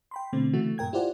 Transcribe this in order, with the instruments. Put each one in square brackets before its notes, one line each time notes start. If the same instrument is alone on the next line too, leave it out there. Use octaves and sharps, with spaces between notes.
[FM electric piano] G5 B5 C6
B2 D3 A3 C4
C#3 E3 A3 F#4
G2 A#2 A#4 G5 G#6
E4 F4 G4 C5 D5 F#5